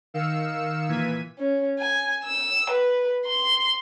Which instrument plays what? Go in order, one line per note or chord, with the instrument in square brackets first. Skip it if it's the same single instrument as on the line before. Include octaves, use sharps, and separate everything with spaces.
[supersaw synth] D#3 F5 E6 C#7 E7
A#2 E3 G#6 B6 D#7
[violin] C#4
G#5
E6
B4
C6